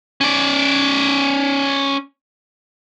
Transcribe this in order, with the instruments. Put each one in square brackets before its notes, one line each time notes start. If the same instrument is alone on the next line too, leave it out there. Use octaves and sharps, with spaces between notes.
[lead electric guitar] C#4 D5